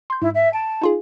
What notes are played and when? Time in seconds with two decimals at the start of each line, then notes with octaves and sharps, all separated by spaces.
0.10 C6 G6
0.22 G#2 E4
0.35 E5
0.53 A5 D7
0.81 D#4 F4 G#4